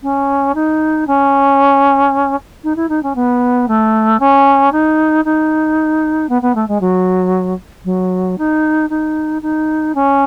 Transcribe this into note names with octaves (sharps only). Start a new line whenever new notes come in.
C#4
D#4
C#4
D#4
E4
D#4
C#4
B3
A3
C#4
D#4
D#4
B3
B3
A3
G#3
F#3
F#3
D#4
D#4
D#4
C#4